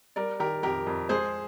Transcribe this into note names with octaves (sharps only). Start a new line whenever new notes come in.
G3 A#4 D5
D#3 G4 A#4
F2 G4 A#4
F2
G#3 G#4 C5